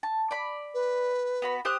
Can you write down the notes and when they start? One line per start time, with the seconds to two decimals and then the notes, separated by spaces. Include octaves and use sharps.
0.03 A5
0.31 D5 B5
0.74 B4
1.42 B3 F#4 B5
1.65 G4 C5 D#6 F#6